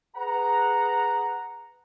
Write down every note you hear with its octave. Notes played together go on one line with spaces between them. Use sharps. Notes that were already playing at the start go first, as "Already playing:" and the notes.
G#4 B4 F#5 A#5